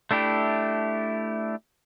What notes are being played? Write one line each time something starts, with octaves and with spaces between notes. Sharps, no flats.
A3 D4 E4 G4